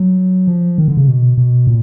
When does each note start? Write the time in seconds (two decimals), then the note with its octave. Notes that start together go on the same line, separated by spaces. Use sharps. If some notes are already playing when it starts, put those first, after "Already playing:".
Already playing: F#3
0.47 F3
0.78 D#3
0.88 D3
0.97 C#3
1.08 B2
1.37 B2
1.67 A#2